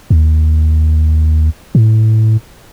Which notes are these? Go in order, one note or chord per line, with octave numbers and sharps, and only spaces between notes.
D#2
A2